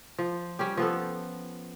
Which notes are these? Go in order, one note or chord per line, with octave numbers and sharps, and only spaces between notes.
F3
G3 C#4 G4
F3 B3 A4